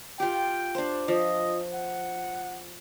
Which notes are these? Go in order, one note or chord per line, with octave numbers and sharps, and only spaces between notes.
F4 G4 G5
D4 C5
F3 D#5
F#5